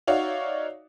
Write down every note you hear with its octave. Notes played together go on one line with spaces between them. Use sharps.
D#4 F#4 C#5 D5 E5 F5